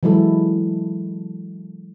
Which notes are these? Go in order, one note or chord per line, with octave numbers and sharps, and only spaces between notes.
E3 F#3 G#3 E4 A4